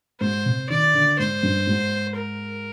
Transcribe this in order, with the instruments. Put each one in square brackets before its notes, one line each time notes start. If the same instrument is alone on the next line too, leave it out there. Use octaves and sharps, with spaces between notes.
[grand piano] G#2 [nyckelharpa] C5
[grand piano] C3
[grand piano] D#3 [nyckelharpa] D5
[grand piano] D3
[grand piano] G#2 [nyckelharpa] C5
[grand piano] G2
G#2
[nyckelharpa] A#4